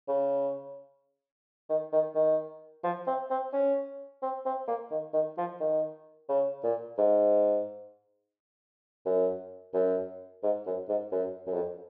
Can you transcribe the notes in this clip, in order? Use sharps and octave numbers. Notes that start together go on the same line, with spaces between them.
C#3
D#3
D#3
D#3
F3
C4
C4
C#4
C4
C4
A#3
D#3
D#3
F3
D#3
C#3
A#2
G#2
F#2
F#2
G#2
F#2
G#2
F#2
F#2
F2